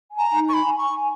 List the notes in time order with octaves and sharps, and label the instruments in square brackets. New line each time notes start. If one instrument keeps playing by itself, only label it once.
[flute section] G#5
[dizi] A#5
[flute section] D#4
[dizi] C#6
[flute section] G#5 [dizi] B5
[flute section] G#5 [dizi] C#6